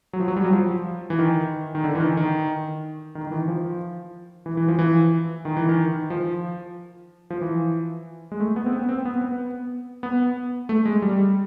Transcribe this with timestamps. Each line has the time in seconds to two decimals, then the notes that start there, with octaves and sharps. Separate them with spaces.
0.13 F#3
0.20 F3
0.28 F#3
0.36 G3
0.44 F#3
0.53 F3
1.10 E3
1.19 D#3
1.75 D#3
1.84 D3
1.95 E3
2.00 D#3
2.17 D#3
3.15 D#3
3.27 D#3
3.31 E3
3.48 F3
4.46 E3
4.57 E3
4.68 F3
4.79 E3
5.45 D#3
5.57 E3
5.69 D#3
6.10 F3
7.30 F3
7.41 E3
8.32 G#3
8.40 A3
8.56 B3
8.66 C4
8.73 B3
8.89 C4
9.05 B3
9.21 B3
10.03 B3
10.69 A3
10.85 G#3
11.02 G3